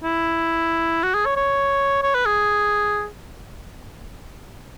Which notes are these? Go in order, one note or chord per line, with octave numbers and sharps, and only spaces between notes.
E4
F#4
G#4
C#5
C#5
C#5
B4
G#4